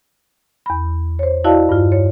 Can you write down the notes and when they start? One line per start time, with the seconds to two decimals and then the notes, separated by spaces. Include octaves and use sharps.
0.66 E2 B5
1.19 C5 C#5
1.44 E4 F#4 D5 D#5 F5 A5
1.69 G2 F4
1.92 C#5